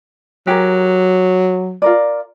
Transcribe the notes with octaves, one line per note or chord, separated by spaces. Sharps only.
F#3 G4 G#4 A#4
F4 A#4 D5